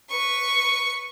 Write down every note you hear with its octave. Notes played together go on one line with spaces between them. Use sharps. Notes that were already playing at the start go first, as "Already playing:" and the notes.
B4 C#6